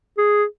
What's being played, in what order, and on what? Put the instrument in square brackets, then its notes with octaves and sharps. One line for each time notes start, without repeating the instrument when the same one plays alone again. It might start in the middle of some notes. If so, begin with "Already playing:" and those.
[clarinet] G#4